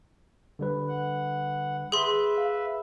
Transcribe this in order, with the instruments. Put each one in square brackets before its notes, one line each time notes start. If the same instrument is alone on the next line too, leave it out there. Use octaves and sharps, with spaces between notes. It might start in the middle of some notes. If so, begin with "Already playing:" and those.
[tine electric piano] D3 G3 B4
[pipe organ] F#5
[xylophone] G#4 C6 [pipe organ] B4 E5
[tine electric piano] F5